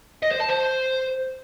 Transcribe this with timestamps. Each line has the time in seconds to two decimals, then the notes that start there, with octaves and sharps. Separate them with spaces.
0.23 D#5
0.31 C5
0.40 A5
0.49 C5